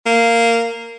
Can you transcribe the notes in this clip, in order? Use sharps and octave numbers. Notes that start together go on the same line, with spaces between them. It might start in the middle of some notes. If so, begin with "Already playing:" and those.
A#3